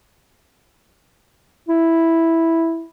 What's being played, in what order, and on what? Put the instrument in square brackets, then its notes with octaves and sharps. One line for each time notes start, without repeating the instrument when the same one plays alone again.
[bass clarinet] E4